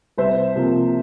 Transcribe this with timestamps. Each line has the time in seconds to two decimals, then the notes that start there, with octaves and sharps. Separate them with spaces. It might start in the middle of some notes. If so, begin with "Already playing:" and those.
0.18 C2 C5 E5
0.56 C3 F3 A#3